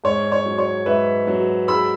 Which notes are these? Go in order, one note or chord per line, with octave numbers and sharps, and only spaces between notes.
G#2 C#5
C#5
F#3
C#5
G#2 B4 E5
F#3
G#3 B5 E6